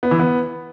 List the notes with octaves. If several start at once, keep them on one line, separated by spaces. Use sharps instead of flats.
B3
E3
B3